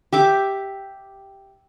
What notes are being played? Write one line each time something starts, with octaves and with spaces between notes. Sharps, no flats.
G4 E5 D6